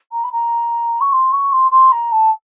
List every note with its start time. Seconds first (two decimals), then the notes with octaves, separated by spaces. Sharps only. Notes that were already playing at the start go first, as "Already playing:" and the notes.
0.12 A#5
0.24 B5
0.33 A#5
1.01 C#6
1.13 C6
1.32 C#6
1.52 C6
1.72 C6
1.92 A#5
2.12 A5